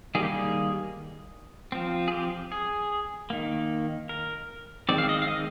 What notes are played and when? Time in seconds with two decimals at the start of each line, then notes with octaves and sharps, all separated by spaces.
0.15 D#3 G3 A#3 G#4
0.23 G4
0.30 G#4
1.72 F3 C4
2.08 G#4
2.12 G4
2.52 G#4
3.30 D#3 A#3
4.09 A#4
4.89 D#3 G#3 C4 D5
4.98 F5
5.09 D#5
5.22 F5
5.28 D#5